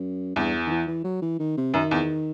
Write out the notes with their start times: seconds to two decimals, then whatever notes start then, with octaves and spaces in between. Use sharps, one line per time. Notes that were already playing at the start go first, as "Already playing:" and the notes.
Already playing: F#2
0.36 E2 G2
0.67 D#3
0.71 E3
0.88 E3
1.04 F#3
1.22 E3
1.39 D#3
1.57 C3
1.74 F#2 D#3
1.91 E2